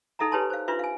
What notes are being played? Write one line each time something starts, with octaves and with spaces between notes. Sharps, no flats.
D#4 A4 E5 F#5 A#5
G4 B4 C#5 G#5 A5 C6
C5 F5
D4 F4 B4 E5 C6
F5 G#5